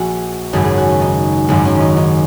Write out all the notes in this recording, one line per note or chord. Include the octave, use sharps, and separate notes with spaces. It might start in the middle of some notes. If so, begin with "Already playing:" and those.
Already playing: A#1 A#2 F#4 G#4
G#1 F#2 C#3 G#4
G#4
F#4
C#4
D#4
G#1 F#2 D#3 D#4
C#4
D#4
D#4